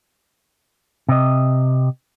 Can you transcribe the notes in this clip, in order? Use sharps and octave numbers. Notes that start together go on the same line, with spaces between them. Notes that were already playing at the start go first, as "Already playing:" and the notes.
C3 D#5